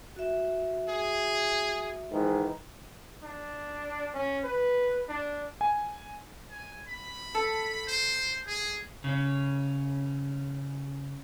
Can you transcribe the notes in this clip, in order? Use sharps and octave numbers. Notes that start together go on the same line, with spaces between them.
F#4 E5
G#4
G#2 D#3 E3
D4
C#4
B4
D4
G#5
G#5
B5
A4
C5
G#4
C#3 C#4